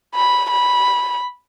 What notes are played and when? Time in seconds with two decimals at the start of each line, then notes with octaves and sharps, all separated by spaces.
0.15 B5
0.51 B5